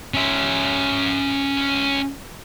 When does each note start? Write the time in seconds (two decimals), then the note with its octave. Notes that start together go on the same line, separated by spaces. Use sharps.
0.14 C#4 E5